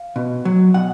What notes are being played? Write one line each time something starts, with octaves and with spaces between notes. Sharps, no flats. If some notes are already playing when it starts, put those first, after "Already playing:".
Already playing: F5
B2
F#3
B2 F#5